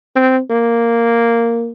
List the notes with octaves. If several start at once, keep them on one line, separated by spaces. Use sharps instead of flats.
C4
A#3